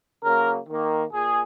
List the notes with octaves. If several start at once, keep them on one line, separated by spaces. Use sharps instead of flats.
C#3 F#3 A#3 A#4
D#3 A#3
A#2 G#4